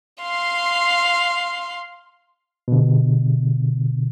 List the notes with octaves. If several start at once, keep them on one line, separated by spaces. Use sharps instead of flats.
F5 C6
B2 D3